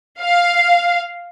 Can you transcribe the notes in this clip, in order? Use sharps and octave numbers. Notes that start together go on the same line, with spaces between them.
F5